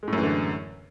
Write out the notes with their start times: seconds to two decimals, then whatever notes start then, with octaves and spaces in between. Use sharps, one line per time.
0.03 G#3
0.08 A2
0.13 F#2
0.18 E3
0.23 D3